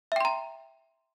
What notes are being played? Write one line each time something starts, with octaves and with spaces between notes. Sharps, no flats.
E5 G5 A#5 C6